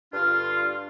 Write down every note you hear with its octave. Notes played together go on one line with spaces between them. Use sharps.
G2 D3 D4 F4